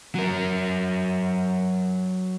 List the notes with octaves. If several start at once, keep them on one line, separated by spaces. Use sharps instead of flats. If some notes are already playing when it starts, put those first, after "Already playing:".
F#3 A#4